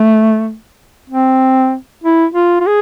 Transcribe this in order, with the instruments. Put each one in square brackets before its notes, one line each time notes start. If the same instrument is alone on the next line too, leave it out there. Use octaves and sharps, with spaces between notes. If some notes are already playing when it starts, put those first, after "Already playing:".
Already playing: [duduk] A3
C4
E4
F4
F4
G#4